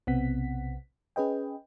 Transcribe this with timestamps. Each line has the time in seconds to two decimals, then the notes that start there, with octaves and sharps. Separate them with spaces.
0.07 B1 C3 B3 C4 F#5 B6
1.16 C#4 G#4 B4 D#5 G5